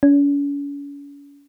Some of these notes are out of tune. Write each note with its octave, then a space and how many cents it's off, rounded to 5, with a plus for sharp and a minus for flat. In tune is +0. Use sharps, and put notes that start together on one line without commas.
C#4 +40